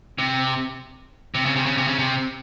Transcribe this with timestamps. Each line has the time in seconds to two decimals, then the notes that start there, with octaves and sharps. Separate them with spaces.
0.18 C3
1.35 C3
1.46 C#3
1.56 C3
1.66 C#3
1.77 C3
1.88 C#3
1.99 C3